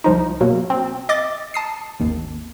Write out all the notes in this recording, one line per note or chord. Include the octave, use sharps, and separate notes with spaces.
C2 F3 D#4
B2 F#3 A#3
C4
D#5 D6 A6
A5 D#6 C7
G#1 D#2